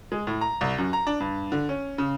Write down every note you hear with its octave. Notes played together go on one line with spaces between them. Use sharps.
G#3
A2
A#5
C2
F#2
A#5
D4
G2
D3
C#4
C#3